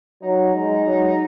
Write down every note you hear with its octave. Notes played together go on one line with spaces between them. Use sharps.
F#3 D#4
G#3
F#3